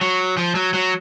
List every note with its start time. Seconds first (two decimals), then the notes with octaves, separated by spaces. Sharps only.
0.01 F#3
0.37 F3
0.55 F#3
0.74 F#3